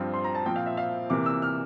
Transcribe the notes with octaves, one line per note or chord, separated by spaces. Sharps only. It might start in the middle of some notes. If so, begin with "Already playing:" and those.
Already playing: G2 F3 C4
C6
A#5
A5
A#2 F3 C4 G5
F5
E5
F5
C3 E3 A#3 D6
E6
F6